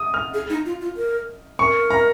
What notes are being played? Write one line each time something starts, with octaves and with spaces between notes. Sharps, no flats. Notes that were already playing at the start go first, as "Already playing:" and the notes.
Already playing: D#6
F6
G#4
D#4
F4
F4
A#4
A#4 C#6
A#5